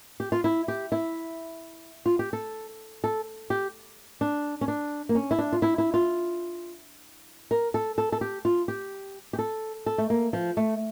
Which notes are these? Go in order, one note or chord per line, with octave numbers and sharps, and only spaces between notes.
G4
F4
E4
G4
E4
F4
G4
A4
A4
G4
D4
C#4
D4
A#3
C#4
E4
D4
F4
E4
E4
F4
A#4
A4
A4
A4
G4
F4
G4
G4
A4
A4
A3
A#3
F3
A3